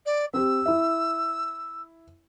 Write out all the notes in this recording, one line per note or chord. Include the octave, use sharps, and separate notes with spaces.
D5
C4 G4 E6
E4 E5